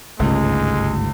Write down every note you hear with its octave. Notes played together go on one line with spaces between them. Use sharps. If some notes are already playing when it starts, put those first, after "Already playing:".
G1 C#2 G#2 G#3 A3